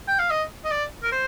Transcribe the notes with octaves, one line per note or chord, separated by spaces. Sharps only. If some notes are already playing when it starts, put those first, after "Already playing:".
G5
F5
D#5
D#5
D5
A#4
C5